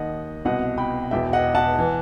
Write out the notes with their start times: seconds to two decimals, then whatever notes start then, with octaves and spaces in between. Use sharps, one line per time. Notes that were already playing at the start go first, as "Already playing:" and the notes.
Already playing: D#2 D#3 D#5 F#5
0.45 C2 B2 D#5 F#5
0.77 G5 B5
1.11 E1 E2 B2 E5 G5
1.33 D#5 F#5
1.55 F#5 A5
1.79 E3